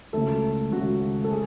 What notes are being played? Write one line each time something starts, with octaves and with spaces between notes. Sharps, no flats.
C#2 C#3 F#3 A3 A4
C#2 C#3 F#3 A3 F#4
A4
G#4